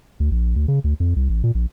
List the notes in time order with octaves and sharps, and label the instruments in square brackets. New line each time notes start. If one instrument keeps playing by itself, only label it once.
[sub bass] D2
A#1
D2
C#3
D2
F2
C2
A1
A#2
A#1